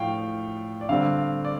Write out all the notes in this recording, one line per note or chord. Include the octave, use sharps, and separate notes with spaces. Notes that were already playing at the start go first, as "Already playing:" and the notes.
Already playing: A2 F3 F5 G5
D5
G2 D3 G3 C4 F5
D5